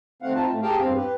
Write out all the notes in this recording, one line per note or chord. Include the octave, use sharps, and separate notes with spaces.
D#2 A3 C4 F5 F#5
C4 D#4 F4 A5
A2 A3
G4 G#4 A#4 F5 G5 A5
E2 G2 C4 F5
G4 B4